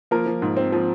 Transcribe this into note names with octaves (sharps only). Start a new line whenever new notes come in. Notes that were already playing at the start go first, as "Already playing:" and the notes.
F3 A#3 A#4
F3
G#2
C4
F3